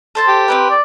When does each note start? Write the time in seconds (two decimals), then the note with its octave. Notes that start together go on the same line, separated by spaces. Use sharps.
0.15 A4 C5 A5
0.28 G4
0.48 C4 C#4 A#4 B4
0.70 D5